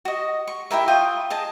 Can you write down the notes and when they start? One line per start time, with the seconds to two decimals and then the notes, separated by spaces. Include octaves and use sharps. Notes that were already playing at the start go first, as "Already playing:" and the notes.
0.05 F#4 D#5
0.47 C#6
0.71 E4 G4 A#4 E5
0.88 F4 G5 C#6 D#6
1.30 G#4 D#5 A5